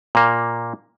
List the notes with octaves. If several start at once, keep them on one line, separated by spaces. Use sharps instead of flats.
A#2 A#3